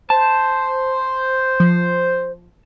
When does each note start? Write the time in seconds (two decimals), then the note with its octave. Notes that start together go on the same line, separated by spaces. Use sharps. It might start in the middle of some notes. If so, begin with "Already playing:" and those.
0.10 C5 A5
1.60 F3